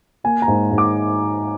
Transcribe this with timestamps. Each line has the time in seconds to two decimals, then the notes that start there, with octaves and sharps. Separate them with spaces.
0.24 A#3 G#5
0.42 A#5
0.48 G#2
0.71 G#2
0.78 D6